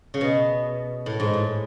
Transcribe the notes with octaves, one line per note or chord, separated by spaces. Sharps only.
C#3
B2
A2
G#2
A2